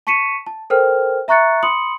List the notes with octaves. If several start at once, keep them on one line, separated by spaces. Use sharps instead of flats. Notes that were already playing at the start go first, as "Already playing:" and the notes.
A5 C#6 B6 C#7 D#7 E7
A5
A4 A#4 C5 G5 F6
E5 A#5 C#6 F#6 A6 C#7
B5 C6 D#6 C#7 F#7